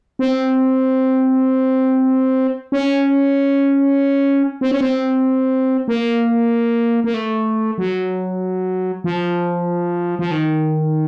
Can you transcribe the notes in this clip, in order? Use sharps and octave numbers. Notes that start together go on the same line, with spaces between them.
C4
C#4
C4
C#4
C4
A#3
A#3
A3
F#3
F3
F3
D#3